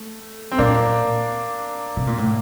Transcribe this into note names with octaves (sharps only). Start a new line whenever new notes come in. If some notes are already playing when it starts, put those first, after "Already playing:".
Already playing: A3
C4
A#2 A#3 D4
C3
A#2
A2